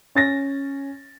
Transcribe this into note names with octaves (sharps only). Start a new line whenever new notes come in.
C#4 A6 A#6